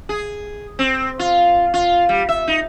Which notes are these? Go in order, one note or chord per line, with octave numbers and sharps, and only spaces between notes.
G#4
C4
F4
F4
G3
E5
D#4